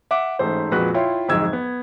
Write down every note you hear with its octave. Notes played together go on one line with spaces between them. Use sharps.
E5 F#5 D6
A1 G#2 A3 C5
F2 A#2 G#3 F#4 B4
E4 F4 C#5 G5 C6
D1 F2 G#2 D#5 E6 G#6
B3